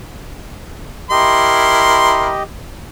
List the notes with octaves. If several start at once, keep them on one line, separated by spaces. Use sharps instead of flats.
E4 G4 A#4 D#5 C6